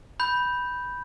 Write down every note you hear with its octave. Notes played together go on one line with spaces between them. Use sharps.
B5 G6